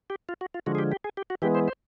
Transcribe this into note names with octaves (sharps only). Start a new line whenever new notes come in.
G4
F4
F#4
F4
D3 F3 G#3 F#4
G#4
G4
G4
G#4
G4
F#4
E3 G#3 B3 G4
C5
C5